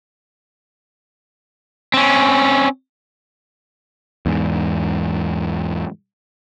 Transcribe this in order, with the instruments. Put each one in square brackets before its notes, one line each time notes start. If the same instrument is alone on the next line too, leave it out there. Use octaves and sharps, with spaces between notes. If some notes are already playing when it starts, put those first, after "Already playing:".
[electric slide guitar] C4 C#4
[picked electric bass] E2 G#2